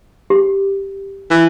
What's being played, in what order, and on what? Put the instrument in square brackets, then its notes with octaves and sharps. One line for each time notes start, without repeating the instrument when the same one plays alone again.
[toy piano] G4
[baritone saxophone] E3